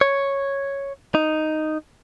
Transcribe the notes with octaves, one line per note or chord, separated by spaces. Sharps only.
C#5
D#4